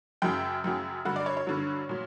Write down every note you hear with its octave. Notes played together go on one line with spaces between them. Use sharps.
F#2 C#3 F#3 G5
F#2 C#3 F#3
G2 D3 F#3 F#5
D5
C#5
C#5
G2 D3 F#3
A#2 F#3